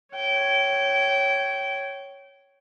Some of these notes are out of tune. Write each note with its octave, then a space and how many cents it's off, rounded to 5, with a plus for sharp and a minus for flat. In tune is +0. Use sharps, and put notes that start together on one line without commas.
C#5 +0 G5 -20